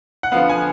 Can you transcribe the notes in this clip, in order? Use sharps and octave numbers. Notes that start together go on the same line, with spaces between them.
F#5
D3 F3 B3 F5
G#5